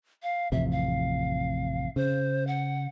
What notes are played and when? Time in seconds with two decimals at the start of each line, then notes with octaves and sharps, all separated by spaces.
0.23 F5
0.52 A1 F2 C3 E5
0.72 F5
1.96 C#3 C5
2.47 F#5